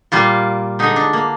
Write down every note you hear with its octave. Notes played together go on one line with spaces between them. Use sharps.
A#2 G3 A#3 F4
D3 G#3 D#4
D4
A#3